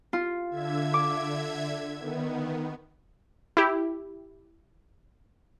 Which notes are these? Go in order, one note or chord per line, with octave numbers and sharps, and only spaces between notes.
F4
D3 E5 G#6
D6
D#3 B3
E4 G4